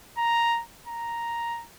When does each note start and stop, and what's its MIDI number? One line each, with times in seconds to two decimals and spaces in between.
0.18 0.62 82
0.87 1.64 82